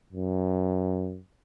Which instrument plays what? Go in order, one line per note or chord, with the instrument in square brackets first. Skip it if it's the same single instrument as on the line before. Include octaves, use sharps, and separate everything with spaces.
[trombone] F#2